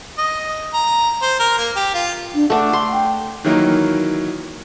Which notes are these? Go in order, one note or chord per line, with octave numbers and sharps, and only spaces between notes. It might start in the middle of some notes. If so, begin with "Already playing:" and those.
D#5
A#5
C5
A#4
A#3
G4
F4
D4
A3 D4 F#5
C6
G5
D#3 E3 F#3 A#3 D#4